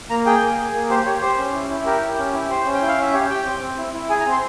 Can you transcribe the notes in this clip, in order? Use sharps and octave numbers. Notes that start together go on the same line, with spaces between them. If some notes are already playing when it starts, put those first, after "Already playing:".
A#3 A#5
G#4 G5
A#3
G#4
A#3
G4 C5
G4 C#5
G4 C5
C#4
E4
E4
G4 A#4
G4
C#4
E4
G4 C5
C#4
G5
E4
F5
C#4 E5
G4 C#5
G4 G5
C4
C4
E4
E4
G#4 G#5
A#5
C4
C6